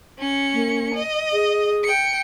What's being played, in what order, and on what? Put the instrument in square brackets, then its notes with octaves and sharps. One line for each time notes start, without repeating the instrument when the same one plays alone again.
[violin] C#4 C#7
[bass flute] A#3
[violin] D#5
[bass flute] G#4
[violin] G5 C#7